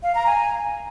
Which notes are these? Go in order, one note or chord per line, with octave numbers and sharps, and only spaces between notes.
F5
A#5
G#5